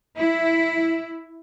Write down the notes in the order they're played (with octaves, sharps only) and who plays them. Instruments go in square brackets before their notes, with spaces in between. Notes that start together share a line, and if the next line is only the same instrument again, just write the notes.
[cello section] E4